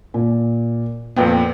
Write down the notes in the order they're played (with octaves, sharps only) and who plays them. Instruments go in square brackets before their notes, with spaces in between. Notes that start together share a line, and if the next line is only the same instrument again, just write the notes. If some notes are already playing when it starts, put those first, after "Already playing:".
[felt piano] A#2
[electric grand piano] F2 A#2 B3 [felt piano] B4 G5